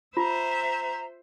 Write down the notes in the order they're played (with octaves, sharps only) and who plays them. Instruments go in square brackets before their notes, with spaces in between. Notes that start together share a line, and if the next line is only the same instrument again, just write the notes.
[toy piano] F4 [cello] C5 E5 [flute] A#5